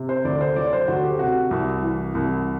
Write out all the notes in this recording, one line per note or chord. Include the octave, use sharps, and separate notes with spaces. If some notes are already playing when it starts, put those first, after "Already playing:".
Already playing: C3
C5
D2 D5
C5
F#3 D5
C5
D2 F#4
G4
C3 F#4
C2
E3
C2